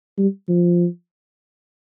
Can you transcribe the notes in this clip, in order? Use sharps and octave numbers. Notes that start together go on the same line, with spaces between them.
G3
F3